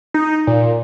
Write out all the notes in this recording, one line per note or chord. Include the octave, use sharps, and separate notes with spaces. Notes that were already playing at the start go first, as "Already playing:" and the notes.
D#4
A#2